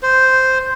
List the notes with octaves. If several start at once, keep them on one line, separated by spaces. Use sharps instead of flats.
C5